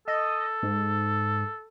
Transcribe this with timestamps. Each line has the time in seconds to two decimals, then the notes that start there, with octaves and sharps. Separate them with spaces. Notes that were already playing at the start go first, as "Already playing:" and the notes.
0.08 A4 D#5
0.63 G#2